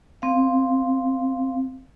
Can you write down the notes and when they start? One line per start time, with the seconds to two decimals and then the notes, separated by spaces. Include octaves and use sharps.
0.22 C4 F5